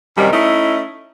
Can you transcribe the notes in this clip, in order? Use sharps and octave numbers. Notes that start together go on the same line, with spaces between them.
F#2 C3 D#3 G3
A3 C#4 D#4 E4 D#5